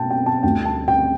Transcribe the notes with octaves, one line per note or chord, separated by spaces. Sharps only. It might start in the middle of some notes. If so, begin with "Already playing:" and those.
Already playing: B2 G5 A5
G5
A5
D2 D3 G3 G5
A5
G5